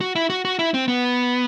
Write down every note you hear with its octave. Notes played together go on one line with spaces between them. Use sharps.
F#4
E4
F#4
F#4
E4
C4
B3